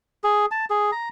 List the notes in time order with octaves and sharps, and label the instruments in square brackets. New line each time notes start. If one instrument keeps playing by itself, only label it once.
[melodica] G#4
A5
G#4
A#5